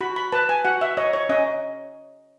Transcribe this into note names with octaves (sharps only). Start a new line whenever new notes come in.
F#4 B5
B5
B4 A5
G#5
F#4 F#5
E5
C#5 D#5
C#5
C#4 D#5